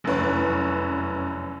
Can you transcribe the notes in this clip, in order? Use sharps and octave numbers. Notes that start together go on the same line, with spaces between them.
F1 F#2 E3 B4 C#5